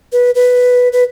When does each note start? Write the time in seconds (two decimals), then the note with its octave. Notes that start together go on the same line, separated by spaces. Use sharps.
0.12 B4
0.35 B4
0.92 B4